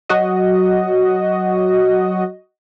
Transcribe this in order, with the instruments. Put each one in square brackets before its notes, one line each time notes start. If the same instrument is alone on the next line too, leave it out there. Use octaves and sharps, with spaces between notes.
[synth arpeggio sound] F#3 F#4 D#5